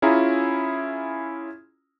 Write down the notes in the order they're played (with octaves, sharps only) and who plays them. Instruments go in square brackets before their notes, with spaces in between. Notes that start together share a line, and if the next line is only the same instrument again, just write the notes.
[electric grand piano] C#4 E4 F4 G#4 A#5